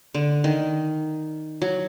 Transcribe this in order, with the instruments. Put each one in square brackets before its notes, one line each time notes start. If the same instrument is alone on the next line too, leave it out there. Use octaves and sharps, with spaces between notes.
[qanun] D3
D#3
F#3